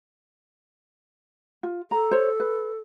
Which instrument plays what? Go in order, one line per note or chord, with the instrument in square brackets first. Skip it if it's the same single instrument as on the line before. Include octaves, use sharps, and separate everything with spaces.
[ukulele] F4
[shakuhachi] A4 [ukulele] A#5
[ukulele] C5 C#5
B4